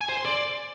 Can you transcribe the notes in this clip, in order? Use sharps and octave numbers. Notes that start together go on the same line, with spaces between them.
G#5
C5
C6
D5